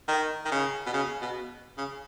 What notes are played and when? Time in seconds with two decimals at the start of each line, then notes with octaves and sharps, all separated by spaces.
0.08 D#3
0.45 D#3
0.52 C#3
0.86 B2
0.93 C#3
1.22 B2
1.78 C#3